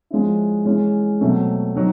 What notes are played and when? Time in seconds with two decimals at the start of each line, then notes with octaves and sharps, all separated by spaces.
0.10 F3 G#3 C#4 E4
0.66 E3 G#3 C#4
1.21 B2 F#3 A3 C4
1.75 F#3 C4 D#4